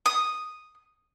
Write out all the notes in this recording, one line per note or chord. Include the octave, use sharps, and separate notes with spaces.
D#6